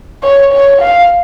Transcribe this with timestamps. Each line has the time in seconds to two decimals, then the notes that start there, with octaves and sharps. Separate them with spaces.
0.23 C#5
0.53 C#5
0.81 F5